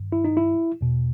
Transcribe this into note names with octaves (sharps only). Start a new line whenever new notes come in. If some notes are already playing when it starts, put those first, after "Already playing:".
Already playing: G2 D#3
E4
D#4
E4
E2 B2